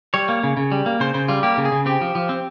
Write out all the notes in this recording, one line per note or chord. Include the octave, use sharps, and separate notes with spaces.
G3 C#5
A#3
C#3
C#3
G3
A#3
C#3 C5
C#3 C5
G3 F4
A#3 G4
C#3
G#4
C#3
C4 G4
F3
F3
C4